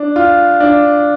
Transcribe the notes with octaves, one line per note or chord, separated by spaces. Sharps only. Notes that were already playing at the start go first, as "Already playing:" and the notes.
Already playing: D4
F4
D4